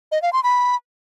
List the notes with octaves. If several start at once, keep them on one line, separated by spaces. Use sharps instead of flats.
D#5
F5
C6
B5